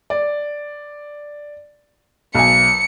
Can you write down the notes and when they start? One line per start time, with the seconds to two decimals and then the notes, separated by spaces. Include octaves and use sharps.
0.10 D5
2.35 B1 G#5 C#7